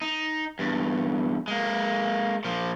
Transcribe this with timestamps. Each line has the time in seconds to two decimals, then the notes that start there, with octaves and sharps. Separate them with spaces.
0.01 D#4
0.59 E2 G2
1.48 G#3 A#3
2.45 A#2 F3